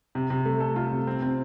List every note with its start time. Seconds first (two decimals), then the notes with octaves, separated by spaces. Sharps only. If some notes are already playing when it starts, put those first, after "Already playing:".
0.15 C3
0.30 C3
0.45 A3
0.60 A4
0.76 F4
0.92 C3
1.07 C4
1.22 C4